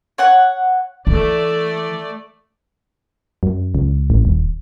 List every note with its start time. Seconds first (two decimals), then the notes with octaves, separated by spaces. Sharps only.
0.18 C#5 F#5 F#6
1.07 E3 A3 D5
3.43 F#2
3.75 C#2
4.10 A1
4.25 D#1